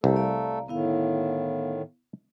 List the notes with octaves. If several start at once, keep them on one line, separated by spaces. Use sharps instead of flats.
C2 G3 A3 G4 A4 A#5
D5 F5 A#5
A2 D3 D#3 B3 E4 F5